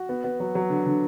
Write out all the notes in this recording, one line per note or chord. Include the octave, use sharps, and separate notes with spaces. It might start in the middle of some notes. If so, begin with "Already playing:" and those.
Already playing: F#4
B3
B3
F#3
F#3
D3
D3